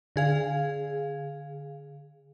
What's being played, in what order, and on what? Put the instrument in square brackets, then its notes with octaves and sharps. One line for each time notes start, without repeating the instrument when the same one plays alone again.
[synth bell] D3 G#4 F5